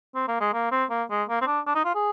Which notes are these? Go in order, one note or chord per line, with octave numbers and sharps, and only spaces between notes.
C4
A#3
G#3
A#3
C4
A#3
G#3
A#3
C4
D4
D4
D#4
F4
G#4